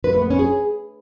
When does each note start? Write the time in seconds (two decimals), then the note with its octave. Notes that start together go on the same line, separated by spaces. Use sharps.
0.04 B4
0.13 A3
0.22 B3
0.30 C#4
0.39 G#4